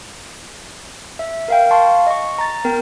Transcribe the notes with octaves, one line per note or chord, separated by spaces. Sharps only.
E5
A#4 F5 G5
F5 A5 C6 C#6
D#5 C#6
A#5 A6
B3 A#4 G5